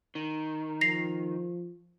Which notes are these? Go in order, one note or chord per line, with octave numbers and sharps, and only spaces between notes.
D#3
F3 A#6 C7 F7